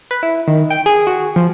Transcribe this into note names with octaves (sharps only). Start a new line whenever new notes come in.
B4
E4
D#3
G5
G#4
F#4
F3